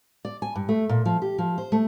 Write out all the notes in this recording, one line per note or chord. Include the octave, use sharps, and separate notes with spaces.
D5
G#5
G2
A3
A#2
F3
G4
F3
C5
A3